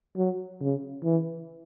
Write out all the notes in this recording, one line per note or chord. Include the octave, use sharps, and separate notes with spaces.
F#3
C#3
E3